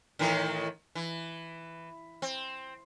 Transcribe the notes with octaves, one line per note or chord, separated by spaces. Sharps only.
A2 D#3 E3
E3
C4